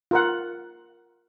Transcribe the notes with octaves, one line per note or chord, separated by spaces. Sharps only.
F4 A#4 F#5